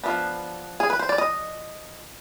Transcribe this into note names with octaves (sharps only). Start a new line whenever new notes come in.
F3 G#3 B3 D4 B4
G#4
B4
C5
D5
D#5